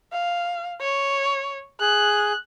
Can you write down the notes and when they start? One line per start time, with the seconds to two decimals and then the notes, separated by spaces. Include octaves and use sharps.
0.12 F5
0.81 C#5
1.81 G#4 F#6